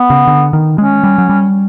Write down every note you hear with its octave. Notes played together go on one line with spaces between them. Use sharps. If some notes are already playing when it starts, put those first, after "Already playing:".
Already playing: B3
C#3
D3
D#3
G#3 C#4
G3
F#3
G3